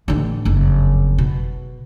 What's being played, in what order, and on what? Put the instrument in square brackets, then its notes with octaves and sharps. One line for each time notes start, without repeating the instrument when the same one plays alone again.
[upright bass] A1 D3
F#1 F2
B2